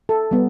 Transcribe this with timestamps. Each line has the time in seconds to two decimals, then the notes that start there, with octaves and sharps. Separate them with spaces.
0.09 A4
0.31 G3 B3